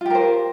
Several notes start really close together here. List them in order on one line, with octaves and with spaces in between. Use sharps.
F4 G4 A#4 C5